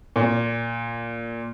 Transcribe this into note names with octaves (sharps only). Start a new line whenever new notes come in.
A#2